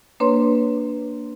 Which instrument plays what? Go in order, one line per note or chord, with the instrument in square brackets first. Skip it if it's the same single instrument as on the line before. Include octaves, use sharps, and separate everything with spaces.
[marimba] A#3 D4 B4 C#5 C6